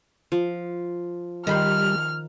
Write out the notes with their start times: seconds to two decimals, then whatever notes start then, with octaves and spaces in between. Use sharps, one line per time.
0.32 F3
1.47 D#3 G3 B5 C6 F6